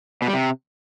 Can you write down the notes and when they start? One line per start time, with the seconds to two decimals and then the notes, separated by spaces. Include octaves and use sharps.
0.22 B2
0.28 G3
0.33 C3